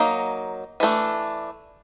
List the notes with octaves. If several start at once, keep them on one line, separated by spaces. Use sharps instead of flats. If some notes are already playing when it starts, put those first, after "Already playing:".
Already playing: F#3 A#3 D#4
E3 A3 D4